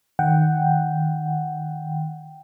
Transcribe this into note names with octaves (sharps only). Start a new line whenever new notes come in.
D#3 F#5 G5